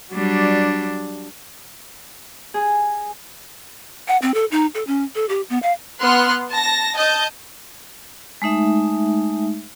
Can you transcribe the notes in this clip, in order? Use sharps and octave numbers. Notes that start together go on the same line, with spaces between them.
F#3 G3 D4
G#4
F#5
C4
A4
D#4
A4
C#4
A4
G4
B3
F5
B3 C6 F6 F#6
A5 A#6
D#5 A5 G6
G#3 A3 D#4 E5